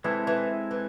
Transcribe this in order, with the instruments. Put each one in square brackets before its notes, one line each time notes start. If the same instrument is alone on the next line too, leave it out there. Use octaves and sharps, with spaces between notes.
[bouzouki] E3 [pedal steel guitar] G#3 C4 E4 A4
[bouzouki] E3
E3